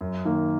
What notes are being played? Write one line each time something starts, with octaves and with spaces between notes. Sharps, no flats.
F#2
D#3 A#3